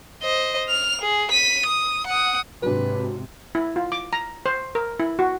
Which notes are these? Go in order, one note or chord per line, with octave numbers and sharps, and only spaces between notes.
C5 D#5
F6 F7
G#4
B6 D#7
D#6
F#5 D#6
G#2 C3 F#3 D4 B4
E4
F4
D6
A#5
C5
A#4
E4
F#4